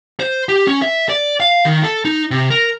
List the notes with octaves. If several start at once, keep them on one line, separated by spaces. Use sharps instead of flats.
C5
G4
C#4
E5
D5
F5
D#3
A4
D#4
C3
A#4